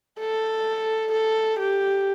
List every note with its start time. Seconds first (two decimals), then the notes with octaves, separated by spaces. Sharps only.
0.20 A4
1.12 A4
1.59 G4